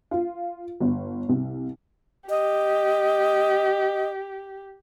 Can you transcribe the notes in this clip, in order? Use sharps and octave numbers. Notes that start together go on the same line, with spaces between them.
F4
G1
C2
G4 D#5